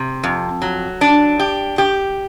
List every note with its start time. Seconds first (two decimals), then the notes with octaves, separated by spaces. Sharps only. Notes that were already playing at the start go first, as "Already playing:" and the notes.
Already playing: C3
0.24 F2
0.62 F#3
1.01 D4
1.40 G4
1.78 G4